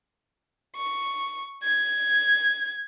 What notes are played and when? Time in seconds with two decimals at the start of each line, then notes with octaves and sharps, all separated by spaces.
0.76 C#6
1.63 G#6